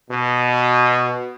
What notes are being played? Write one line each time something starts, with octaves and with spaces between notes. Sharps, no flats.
B2